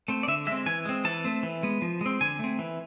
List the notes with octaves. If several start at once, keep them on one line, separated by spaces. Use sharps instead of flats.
A3 C4
D5
D3 E5
G#3 E5
C4
E3 G#5
G#3 C4
E3 A5
A3 C4
E3
G#3 B3
F3
G#3 C4
D3 G#5
A3 C4
E3